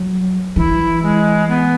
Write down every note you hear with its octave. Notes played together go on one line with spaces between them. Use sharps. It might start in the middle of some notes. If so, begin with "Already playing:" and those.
Already playing: F#3
E3 E4
G#3
B3